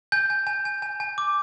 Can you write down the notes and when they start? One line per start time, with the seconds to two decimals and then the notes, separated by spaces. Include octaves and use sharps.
0.12 G#5 G6
0.30 G#5
0.47 G#5
0.65 G#5
0.82 G#5
1.00 G#5
1.18 D6